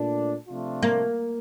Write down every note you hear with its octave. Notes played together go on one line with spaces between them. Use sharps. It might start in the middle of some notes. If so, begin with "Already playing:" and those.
Already playing: A#2 A3 D4
C3 F3 A3 D4 F4
A#3